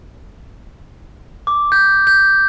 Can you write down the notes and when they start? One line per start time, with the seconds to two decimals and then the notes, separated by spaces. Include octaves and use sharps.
1.47 D6
1.72 G6
2.07 G6